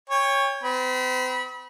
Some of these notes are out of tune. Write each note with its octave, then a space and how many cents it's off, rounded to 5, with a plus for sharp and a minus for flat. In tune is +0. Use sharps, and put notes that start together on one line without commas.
C#5 +0 G5 +35
C4 -40 B5 -25